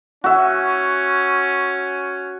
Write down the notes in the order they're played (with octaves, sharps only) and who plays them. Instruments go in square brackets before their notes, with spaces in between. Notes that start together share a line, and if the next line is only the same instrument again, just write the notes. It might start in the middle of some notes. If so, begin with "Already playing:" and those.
[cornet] C#4 [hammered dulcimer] F#4 E5